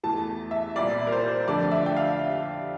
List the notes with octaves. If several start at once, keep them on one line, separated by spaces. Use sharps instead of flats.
E2 E3 A3 A5
E5
C2 A#2 G3 D5
A#4
C5
F2 D3 A3 D5
E5
G5
F5